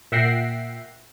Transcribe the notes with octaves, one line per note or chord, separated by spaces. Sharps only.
A#2 E5 F#5 G5 A#6 C7